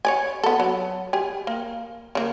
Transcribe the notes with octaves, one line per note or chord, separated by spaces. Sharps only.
C#5 D5 G#5
B3 A4
F#3
G4 G#5
A#3
C#3 A#3